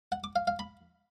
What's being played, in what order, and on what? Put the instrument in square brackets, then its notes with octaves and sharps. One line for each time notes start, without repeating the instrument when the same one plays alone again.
[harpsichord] F#5
D6
F5
F5
B5